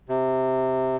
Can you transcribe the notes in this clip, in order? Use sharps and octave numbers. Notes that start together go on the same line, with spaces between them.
C3